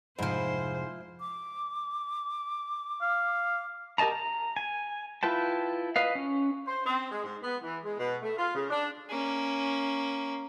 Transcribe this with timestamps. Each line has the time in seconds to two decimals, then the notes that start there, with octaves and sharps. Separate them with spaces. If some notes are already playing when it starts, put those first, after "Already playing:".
0.19 F1 F2 G#2 F3 E4 C5
1.20 D6
3.01 F5
3.98 G4 A#4 D#5 A5 A#5
4.12 A#5
4.56 G#5
5.23 E4 F4 B4 G5 A5
5.96 B4 D#5 F5
6.15 C#4
6.68 C5
6.86 C4
7.11 G#3
7.24 G#2
7.43 B3
7.63 E3
7.84 G#3
7.99 B2
8.22 A3
8.38 F4
8.55 C#3
8.71 D4
9.09 A#3 C#4